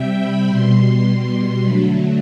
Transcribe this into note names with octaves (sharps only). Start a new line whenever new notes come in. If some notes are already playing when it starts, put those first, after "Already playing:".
Already playing: C3 G3 E5 G5
B5
B2 G3 C6
D3 F#3 A3 B5